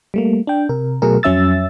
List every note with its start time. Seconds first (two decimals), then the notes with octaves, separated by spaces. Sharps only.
0.14 G3 A3 A#3
0.47 D4 G5
0.69 C3 A#4
1.02 B2 F#3 A3 G#4 A#4
1.23 F2 F#3 C#4 E5 E6 A6